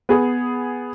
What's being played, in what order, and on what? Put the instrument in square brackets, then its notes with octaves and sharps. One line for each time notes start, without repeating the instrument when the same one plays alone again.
[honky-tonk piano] B3 G#4